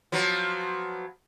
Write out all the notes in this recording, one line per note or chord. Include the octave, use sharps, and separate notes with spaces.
F3 F#3 B3